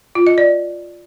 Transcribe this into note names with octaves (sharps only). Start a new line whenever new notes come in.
F4
D#5
D5